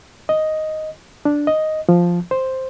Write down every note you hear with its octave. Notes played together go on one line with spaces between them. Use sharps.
D#5
D4
D#5
F3
C5